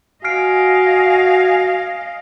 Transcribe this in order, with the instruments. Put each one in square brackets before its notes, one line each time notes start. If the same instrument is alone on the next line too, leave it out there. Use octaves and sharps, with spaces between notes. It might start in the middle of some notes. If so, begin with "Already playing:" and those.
[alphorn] F#4 [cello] D#5 F5 [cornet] G#5 [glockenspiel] F6 C7 D7